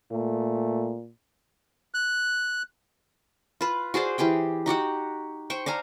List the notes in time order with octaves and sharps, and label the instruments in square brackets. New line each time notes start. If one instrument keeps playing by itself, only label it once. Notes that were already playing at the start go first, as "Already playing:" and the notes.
[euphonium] A#2 [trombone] A3
[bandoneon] F#6
[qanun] F4 B4
F#4 G#4 C5 D5
E3 G4 G#4 G5
D#4 F#4 G4 F#5
C5 G5 C#6
D4 F5 G#5 A#5